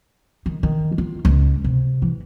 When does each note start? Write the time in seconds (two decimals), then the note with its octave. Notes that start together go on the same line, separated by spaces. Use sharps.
0.46 D#3
0.63 D#3
0.98 F4
1.25 C#2
1.64 C3
2.02 E3